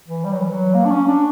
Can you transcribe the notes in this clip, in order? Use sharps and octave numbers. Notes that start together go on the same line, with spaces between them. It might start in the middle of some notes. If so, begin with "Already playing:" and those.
E3
G3
F#3
E3
F#3
A#3
D4
C#4
D4